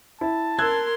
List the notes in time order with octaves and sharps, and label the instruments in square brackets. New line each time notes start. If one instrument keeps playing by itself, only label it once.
[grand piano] E4 [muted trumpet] A5
[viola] A#4 C6 [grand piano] E6 F#6 G#6